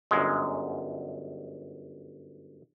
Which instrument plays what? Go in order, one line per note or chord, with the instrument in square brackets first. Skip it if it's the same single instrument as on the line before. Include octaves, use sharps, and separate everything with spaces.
[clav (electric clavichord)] G1 F#2 G#3